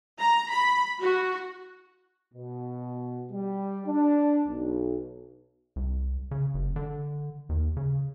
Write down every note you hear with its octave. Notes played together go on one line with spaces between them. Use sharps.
A#5
B5
F#4
B2
G3
D4
B1
C2
C#3
F#1
D3
D#2
C#3